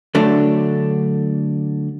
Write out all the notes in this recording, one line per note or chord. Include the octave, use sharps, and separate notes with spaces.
D3 F#3 A3 D4